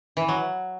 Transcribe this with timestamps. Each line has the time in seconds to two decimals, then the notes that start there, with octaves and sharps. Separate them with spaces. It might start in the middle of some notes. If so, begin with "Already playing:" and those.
0.17 E3
0.28 F#3